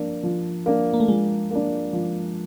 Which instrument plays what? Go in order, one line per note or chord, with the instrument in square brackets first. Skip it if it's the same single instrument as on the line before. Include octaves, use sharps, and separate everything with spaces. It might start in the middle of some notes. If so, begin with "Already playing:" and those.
Already playing: [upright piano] F3 A#3 D4
F3
A#3 D4
[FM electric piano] A#3
A3
[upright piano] F3 [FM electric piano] G#3
[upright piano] A#3 D4
F3